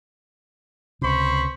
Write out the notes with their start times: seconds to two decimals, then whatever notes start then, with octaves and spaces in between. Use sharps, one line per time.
1.01 C#2 C3 C5 B5 C#6